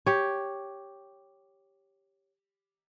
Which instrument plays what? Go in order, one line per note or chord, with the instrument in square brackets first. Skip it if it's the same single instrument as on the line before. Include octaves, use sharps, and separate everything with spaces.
[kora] G4 C#5